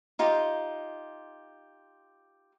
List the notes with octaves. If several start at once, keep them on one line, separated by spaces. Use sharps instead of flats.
D#4 F4 G4